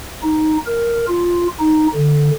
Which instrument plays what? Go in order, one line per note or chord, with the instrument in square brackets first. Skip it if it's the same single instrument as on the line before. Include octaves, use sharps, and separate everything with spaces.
[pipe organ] D#4
A#4
F4
D#4
D3